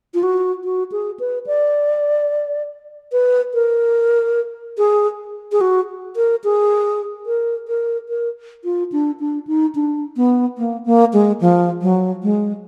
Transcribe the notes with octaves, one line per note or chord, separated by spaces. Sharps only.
F4
F#4
F#4
G#4
B4
D5
B4
A#4
G#4
G#4
F#4
A#4
G#4
A#4
A#4
A#4
F4
D4
D4
D#4
D4
B3
A#3
A#3
G#3
F3
F#3
G#3